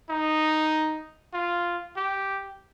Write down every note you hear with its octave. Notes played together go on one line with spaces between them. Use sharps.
D#4
F4
G4